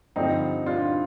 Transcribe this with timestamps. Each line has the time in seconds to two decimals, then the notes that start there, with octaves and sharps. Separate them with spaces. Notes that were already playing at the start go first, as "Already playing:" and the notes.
0.16 G2 D3 F3 C4 D#4
0.66 D4 F4